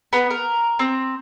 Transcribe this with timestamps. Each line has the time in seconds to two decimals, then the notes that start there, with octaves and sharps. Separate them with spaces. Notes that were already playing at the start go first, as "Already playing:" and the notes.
0.13 B3
0.30 A#4
0.79 C4